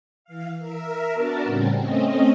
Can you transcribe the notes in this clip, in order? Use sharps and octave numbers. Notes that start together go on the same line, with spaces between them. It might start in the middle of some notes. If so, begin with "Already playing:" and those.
E3 F5
A#4 E5
B3 D4 F#4 A#4 A5
A2 C#3 G3 C4 C#4
A3 C4 C#4 D#5